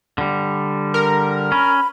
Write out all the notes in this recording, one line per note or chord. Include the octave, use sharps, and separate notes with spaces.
D3 G3
A#4
C#4 B5